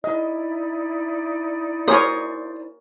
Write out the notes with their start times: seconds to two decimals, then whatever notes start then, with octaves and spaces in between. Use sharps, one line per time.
0.04 D#4 E4 D5 D#5
1.88 A#4 C5 C#5 G#5 D#6